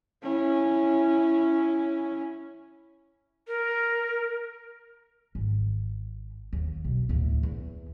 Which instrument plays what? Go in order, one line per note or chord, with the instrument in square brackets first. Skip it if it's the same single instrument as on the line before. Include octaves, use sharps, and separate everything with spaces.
[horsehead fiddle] C#4 E4
[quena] A#4
[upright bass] G#1
D#2
B1
D2 A2
E2